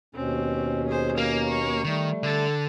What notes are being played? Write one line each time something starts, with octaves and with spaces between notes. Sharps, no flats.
D#2 B2 C4 C#4
G#4 C5
A#3 F5
C#6
D#3 G3 A3
D3 A4 A5